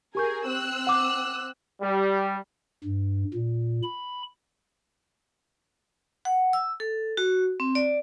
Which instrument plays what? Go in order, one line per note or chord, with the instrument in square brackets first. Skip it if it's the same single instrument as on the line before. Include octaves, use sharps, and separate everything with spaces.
[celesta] G4 C#6 G6 [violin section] G#4 A#4 G#5
[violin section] C4 E6 F#6
[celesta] F#5 D6
[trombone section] G3
[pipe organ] G2
A#2
B5
[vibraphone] F#5
E6
A4
F#4
C4
D5